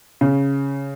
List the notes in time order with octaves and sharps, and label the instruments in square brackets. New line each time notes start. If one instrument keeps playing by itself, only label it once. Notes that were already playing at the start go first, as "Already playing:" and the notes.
[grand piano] C#3